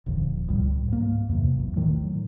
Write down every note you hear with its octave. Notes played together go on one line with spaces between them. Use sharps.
D#1 A#1 F2 D3
C#2 A2 G3
G#2 A#3
E2 G2 C3 F#3
A#1 E2
A2 D#3 F#3 A3